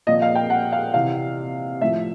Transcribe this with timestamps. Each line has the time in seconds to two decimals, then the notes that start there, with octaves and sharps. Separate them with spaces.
0.07 A#2 F3 D#5
0.22 F5
0.35 G5
0.50 F#5
0.73 F5
0.94 C3 E3 F5
1.81 A2 F3 E5